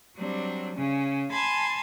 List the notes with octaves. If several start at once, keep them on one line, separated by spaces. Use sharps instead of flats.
F#3 G3 C4 D4
C#3 C#4
G#5 A5 B5 C6 G#6 A6